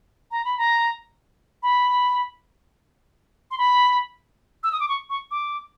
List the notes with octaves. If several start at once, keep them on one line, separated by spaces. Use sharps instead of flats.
A#5
B5
A#5
B5
C6
B5
E6
D#6
D6
C#6
C#6
D6